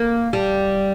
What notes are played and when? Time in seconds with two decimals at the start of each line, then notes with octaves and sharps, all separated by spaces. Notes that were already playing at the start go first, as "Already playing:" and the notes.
Already playing: A#3
0.33 G3